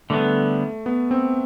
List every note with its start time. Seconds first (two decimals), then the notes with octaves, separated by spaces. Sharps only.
0.10 D3 G3 A3 B3
0.86 B3
1.11 C4